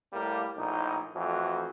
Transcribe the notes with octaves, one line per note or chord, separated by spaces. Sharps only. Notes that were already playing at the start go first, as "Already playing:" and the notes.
A2 G3 A#3
A#1 A2 D#4
F2 A2 E3 F#4